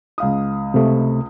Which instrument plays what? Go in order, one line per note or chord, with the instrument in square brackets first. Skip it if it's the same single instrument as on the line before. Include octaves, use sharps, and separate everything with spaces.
[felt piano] C#2 F5 D#6
[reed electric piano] C3 A3